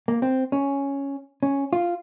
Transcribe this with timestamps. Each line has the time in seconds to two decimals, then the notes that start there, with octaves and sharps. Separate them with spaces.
0.08 A#3
0.22 C4
0.52 C#4
1.43 C#4
1.73 F4